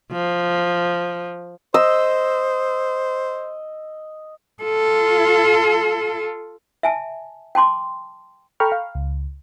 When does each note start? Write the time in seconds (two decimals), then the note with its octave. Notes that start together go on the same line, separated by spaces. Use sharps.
0.12 F3
1.74 C5 D#5 E6
4.63 F4 A4
6.83 E5 G#5 A5
7.55 G5 A5 C6 D6
8.60 A4 G5 A#5 B5 C#6 F6
8.72 F5
8.95 C#2